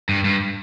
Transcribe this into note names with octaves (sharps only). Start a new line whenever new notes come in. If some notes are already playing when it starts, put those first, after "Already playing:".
G2
G2